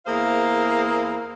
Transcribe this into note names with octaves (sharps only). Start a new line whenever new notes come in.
E2 A#3 E4 G#4 C5 F5